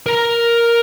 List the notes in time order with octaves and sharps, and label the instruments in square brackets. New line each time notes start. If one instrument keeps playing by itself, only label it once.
[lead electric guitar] A#4 A#5